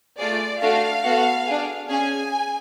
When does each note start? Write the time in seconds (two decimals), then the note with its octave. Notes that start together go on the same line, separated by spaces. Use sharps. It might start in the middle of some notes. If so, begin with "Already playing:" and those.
0.19 A3 F4 G#4 D5
0.61 A3 D4 F#4 A4 F5
1.05 B3 F#4 A4
1.46 D4 G#4
1.89 C#4 G#4 G#5